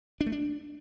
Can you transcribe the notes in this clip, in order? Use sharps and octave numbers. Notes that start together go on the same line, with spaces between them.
D4
A3
D4